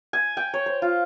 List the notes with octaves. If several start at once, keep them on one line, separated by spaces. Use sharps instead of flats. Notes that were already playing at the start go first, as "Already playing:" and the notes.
G#5
G5
C#5
C5
F4